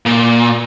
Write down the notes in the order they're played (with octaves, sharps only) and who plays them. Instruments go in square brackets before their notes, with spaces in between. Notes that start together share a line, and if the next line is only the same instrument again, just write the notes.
[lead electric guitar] A#2